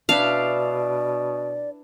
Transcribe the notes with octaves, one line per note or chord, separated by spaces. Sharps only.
B2 D4 E4 B4 D5 F5